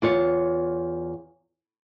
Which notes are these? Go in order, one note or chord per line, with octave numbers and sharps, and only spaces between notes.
E2 F4 C#5